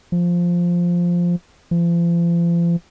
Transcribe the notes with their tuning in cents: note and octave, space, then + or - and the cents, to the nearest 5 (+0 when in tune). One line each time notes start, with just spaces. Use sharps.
F3 +0
F3 -40